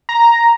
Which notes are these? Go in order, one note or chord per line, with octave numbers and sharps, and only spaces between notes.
A#5